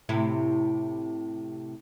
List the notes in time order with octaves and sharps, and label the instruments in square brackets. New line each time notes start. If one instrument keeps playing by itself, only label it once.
[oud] A2 C3 E4